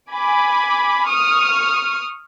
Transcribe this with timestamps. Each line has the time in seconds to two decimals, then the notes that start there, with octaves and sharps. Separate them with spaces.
0.14 G#5 B5 D6
1.10 C#6 D#6 F6